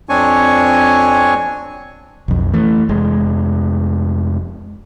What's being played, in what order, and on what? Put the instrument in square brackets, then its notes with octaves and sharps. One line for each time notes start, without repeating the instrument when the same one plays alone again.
[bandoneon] F2 C4 D4 C#5 G#5 C#6
[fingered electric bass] B1 F2
E3 A3
F1 G#3